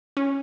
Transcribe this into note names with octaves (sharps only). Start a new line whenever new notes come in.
C#4